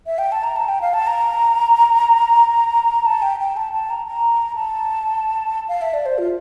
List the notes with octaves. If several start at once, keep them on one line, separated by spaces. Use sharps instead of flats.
E5
G5
A5
A#5
A5
G5
F5
A5
A#5
A5
G5
G5
A5
A5
A#5
A#5
A5
F5
E5
D5
C5
F4